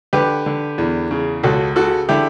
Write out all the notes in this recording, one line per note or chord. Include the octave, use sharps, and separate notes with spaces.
D3 G4 B4
D3
E2
C#3
C#2 F#4 A4
C#3 F#4 A4
D3 E4 G4